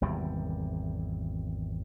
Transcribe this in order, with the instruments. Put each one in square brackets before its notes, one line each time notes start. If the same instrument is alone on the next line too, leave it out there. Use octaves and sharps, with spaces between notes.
[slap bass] G#1 E2 C3 G3